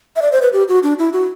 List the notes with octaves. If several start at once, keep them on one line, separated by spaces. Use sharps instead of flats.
E5
D5
C5
B4
G4
F#4
D4
E4
F#4